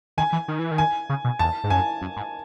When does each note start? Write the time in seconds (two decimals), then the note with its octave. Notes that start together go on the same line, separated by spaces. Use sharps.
0.18 D#3 G#5
0.33 E3
0.48 D#3
0.59 E3
0.71 D#3
0.78 G#5
1.09 C#3
1.24 B2
1.39 E2 A5
1.64 G#2
1.70 F#2 G#5
2.01 F#2
2.17 G#2